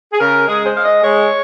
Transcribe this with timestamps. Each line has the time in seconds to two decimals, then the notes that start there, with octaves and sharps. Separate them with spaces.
0.12 G#4
0.19 C#3 A#4
0.46 G#3 G#4
0.65 C5
0.75 G#3 F5
0.84 D#5
1.03 G#3 C#5